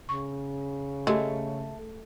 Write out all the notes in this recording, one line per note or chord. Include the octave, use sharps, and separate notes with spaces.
C#3 C#6
G#3 A3 G4